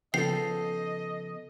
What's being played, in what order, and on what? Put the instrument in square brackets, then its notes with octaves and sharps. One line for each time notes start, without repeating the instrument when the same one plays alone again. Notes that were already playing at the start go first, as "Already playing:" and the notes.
[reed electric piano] C#3 F3 B3 [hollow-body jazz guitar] A4 G5 [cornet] D#5 [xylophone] C7